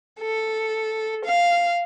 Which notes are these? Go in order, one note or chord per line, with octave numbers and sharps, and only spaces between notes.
A4
F5